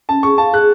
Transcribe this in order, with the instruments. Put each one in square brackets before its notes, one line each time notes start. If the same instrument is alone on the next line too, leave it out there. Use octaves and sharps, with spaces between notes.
[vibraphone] C#4 [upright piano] A5
[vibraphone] G#4 [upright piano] C#6
[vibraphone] F5 [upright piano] A5
[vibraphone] G#4 [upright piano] F#6